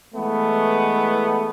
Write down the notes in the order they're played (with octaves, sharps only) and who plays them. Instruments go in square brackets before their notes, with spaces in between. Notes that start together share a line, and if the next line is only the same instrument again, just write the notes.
[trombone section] E3 G#3 A3 B3